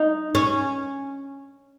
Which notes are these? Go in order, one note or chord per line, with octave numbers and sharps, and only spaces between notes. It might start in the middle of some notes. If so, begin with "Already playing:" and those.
Already playing: D#4
C#4